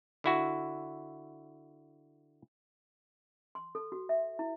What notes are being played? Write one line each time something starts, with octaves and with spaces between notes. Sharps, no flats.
D3 E4 F#4
C6
A4
F#4
E5
E4